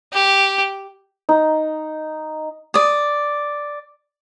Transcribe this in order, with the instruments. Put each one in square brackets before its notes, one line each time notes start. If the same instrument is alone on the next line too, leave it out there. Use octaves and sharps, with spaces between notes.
[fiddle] G4
[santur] D#4
[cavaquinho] D5 D#6